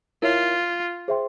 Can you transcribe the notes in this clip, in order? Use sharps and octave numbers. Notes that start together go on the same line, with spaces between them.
E4 F4 A#4 C#5 E5
G#4 C5 E5 G5 C6